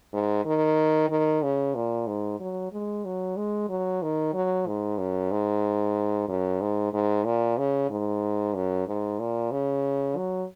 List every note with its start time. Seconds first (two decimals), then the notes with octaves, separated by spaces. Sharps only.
0.13 G#2
0.45 D#3
1.09 D#3
1.42 C#3
1.75 A#2
2.07 G#2
2.40 F#3
2.72 G#3
3.05 F#3
3.37 G#3
3.69 F#3
4.02 D#3
4.33 F#3
4.67 G#2
4.98 F#2
5.31 G#2
6.28 F#2
6.61 G#2
6.93 G#2
7.25 A#2
7.58 C#3
7.90 G#2
8.55 F#2
8.87 G#2
9.20 A#2
9.51 C#3
10.17 F#3